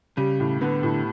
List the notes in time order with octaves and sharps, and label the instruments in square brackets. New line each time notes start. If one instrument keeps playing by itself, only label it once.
[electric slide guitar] C#3 [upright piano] G3
[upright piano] A2
[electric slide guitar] D3 [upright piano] B3
[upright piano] A2